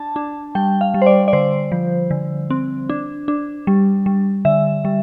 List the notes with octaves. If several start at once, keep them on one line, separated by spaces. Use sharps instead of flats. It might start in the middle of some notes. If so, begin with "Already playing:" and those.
Already playing: D4 A5
D4
G3 G5
F5
G3
C5
D5
D5
D3 C5
F3
D3
C4
D4
D4
G3
G3
D3 E5
G3